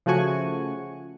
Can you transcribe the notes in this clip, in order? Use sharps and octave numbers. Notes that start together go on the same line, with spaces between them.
C#3 F3 A3 F#4 G#5 C#6